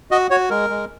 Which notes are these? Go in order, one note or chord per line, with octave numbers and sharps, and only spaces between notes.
F#4 D#5
F#4 C#5
G#3 A#4
G#3